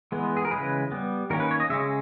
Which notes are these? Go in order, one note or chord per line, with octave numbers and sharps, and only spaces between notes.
E3 G#3 B3
G#4
A#4
C#3 E3 G#3 B4
G3 B3
D#3 A#3 C#4 A#4
B4
C#5
D#5
C#3 G#3 C#4 E5